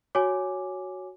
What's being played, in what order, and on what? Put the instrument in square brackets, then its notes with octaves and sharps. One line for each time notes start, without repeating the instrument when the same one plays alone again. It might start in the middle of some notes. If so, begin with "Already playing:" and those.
[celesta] F#4 C#5 G#5 D6